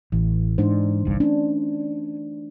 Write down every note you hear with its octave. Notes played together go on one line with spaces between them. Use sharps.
A1 E3
G#2 D4 D#4 C5
G1 C2 G2
A3 C#4 D4